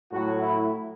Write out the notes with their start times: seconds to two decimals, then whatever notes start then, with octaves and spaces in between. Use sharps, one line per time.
0.11 A2 F#3 F#4
0.40 E4